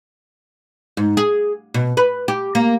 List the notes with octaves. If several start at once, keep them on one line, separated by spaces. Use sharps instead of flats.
G#2
G#4
B2
B4
G4
A#3